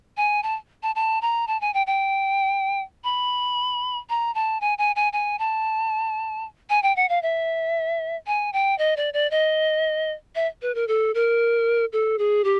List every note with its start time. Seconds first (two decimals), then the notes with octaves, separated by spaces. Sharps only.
0.17 G#5
0.43 A5
0.83 A5
0.95 A5
1.22 A#5
1.48 A5
1.61 G#5
1.74 G5
1.87 G5
3.04 B5
4.10 A#5
4.35 A5
4.61 G#5
4.78 G#5
4.96 G#5
5.13 G#5
5.39 A5
6.70 G#5
6.83 G5
6.96 F#5
7.09 F5
7.22 E5
8.27 G#5
8.53 G5
8.78 D#5
8.97 D5
9.14 D5
9.31 D#5
10.35 E5
10.62 B4
10.75 A#4
10.88 A4
11.15 A#4
11.93 A4
12.18 G#4
12.44 G4